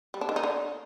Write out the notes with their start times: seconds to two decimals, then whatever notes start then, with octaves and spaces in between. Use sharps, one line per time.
0.14 G3
0.21 D4
0.29 D#3
0.36 D#4
0.44 D3